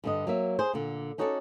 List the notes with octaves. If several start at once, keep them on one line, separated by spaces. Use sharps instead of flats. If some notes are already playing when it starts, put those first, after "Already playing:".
G2 D3 D#5
F#3 A#3 E5
G#4 C5
A#2 D3
C#4 D#4 F#4 A4 C5 D5